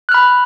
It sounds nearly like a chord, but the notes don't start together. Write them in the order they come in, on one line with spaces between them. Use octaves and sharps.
F#6 F6 B5